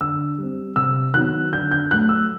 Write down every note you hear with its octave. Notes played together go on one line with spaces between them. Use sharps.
D3 E6
G3 C4
C3 E6
D#3 F#3 B3 F#6
D3 G6
G6
F#3 A3 F#6
E6